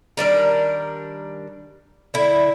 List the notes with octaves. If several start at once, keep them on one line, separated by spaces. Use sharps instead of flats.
D#3 G3 D4 A#4
D3 E4